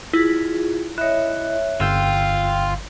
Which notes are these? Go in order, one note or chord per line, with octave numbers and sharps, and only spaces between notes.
E4 F4 G#4
E4 C#5 D#5 E5 F#6
G1 F4 G5 E6 G6